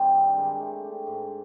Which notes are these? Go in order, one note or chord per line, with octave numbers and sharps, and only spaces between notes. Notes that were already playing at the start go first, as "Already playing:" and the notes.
Already playing: D#3 G3 C4
G2
D#3 G#3
A3
D4 G4
G#2